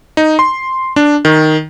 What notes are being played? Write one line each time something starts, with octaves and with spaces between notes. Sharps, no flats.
D#4
C6
D4
D#3